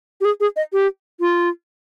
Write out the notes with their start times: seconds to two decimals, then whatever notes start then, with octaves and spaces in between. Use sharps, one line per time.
0.21 G4
0.25 G#4
0.40 G#4
0.56 D#5
0.73 G4
1.20 F4